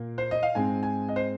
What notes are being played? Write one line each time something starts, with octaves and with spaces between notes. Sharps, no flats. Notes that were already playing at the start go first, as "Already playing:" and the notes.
Already playing: A#2 A#3
C5
D#5
F5
G#2 G#3 C4 G#5
G#5
D#5
C5